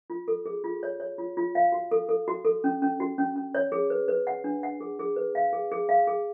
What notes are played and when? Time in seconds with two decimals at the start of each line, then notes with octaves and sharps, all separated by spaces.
0.10 F4
0.28 A4
0.46 G#4
0.64 F4
0.83 C#5
1.00 C#5
1.18 F4
1.37 F4
1.55 F5
1.72 F#4
1.91 A4
2.09 A4
2.28 F#4
2.45 A4
2.64 C#4
2.82 C#4
3.00 F#4
3.18 C#4
3.36 C#4
3.55 C#5
3.72 G#4
3.90 B4
4.08 B4
4.27 F#5
4.44 D4
4.63 F#5
4.81 G#4
4.99 G#4
5.16 B4
5.35 F5
5.53 G#4
5.71 G#4
5.89 F5
6.07 G#4